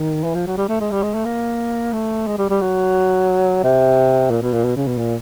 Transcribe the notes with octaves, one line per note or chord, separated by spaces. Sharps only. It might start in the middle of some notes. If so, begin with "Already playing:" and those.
Already playing: D#3
E3
F3
F#3
G3
A3
G#3
G3
G#3
A3
A#3
A3
G#3
G3
G3
F#3
C3
A#2
B2
A#2
B2
C#3
B2
A#2